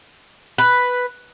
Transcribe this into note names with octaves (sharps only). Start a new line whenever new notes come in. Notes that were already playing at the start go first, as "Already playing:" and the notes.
B4